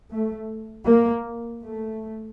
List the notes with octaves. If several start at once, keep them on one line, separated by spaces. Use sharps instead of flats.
A3
A#3
A3